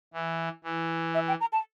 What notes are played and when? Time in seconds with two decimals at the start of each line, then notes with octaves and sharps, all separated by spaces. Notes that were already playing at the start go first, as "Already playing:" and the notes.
0.14 E3
0.64 E3
1.14 E5
1.28 G5
1.40 A#5
1.52 A5